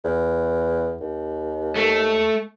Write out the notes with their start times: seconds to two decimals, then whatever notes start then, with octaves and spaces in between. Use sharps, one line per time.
0.04 E2
1.01 D#2
1.76 A3